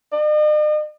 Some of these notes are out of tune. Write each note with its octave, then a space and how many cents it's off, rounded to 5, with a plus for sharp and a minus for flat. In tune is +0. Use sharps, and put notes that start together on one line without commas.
D#5 -45